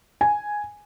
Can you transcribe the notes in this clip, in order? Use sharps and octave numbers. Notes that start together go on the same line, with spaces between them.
G#5